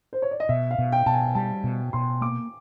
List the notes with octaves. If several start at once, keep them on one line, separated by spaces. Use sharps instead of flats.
C5
C#5
D5
D#5
B2 E5
F5
B2
G5
B2 A5
G#5
G3 A5
B2
B2 C6
A#3 D6